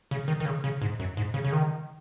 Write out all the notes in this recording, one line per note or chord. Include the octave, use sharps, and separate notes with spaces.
C#3
D#3
D#3
C#3
C#3
G#2
F#2
G#2
C#3
C#3
D#3